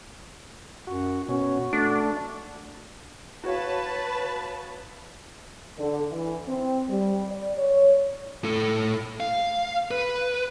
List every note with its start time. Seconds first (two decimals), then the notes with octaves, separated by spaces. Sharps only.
0.87 F#2 F#4
1.29 B2 C#4 F#4
1.73 A3 D4
3.44 F#4 B4 C#5 F5 A5
5.79 D3
6.12 E3
6.48 C4
6.89 G3
7.29 D5
7.58 C#5
8.44 A2 A4
9.20 F5
9.91 B4